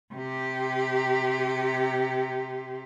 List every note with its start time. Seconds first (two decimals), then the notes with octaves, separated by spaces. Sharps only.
0.14 C3 G4